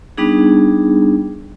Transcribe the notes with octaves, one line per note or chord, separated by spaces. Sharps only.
G3 B3 D4 D#4 G#4